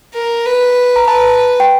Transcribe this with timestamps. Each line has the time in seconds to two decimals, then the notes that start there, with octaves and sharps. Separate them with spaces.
0.14 A#4
0.45 B4
0.96 A#5
1.07 B4 A5
1.60 G5